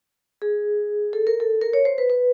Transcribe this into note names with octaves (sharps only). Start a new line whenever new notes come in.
G#4
A4
A#4
A4
A#4
C#5
C5
B4
B4